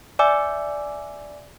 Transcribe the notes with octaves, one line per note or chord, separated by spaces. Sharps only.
D5 E5 G#5 D6 E6